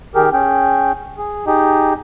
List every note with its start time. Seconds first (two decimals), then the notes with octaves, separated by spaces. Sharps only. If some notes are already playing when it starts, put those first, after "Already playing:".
0.15 D#3 G4 G#4 A#4
0.33 C#4 G#4 G5
1.18 G#4
1.47 D#4 G4 G#4 D#5